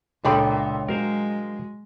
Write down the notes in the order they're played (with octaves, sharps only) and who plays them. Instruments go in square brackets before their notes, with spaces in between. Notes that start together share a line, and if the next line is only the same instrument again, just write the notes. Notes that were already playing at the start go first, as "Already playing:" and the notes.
[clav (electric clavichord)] C#2 [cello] A#2 [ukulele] D4 G5 B5 [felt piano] A4 C6 D#6
[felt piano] F#3 [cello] G#3 [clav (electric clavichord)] A#4 C5 F5